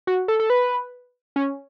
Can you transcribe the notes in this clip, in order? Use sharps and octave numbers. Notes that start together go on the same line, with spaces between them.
F#4
A4
A4
B4
C#4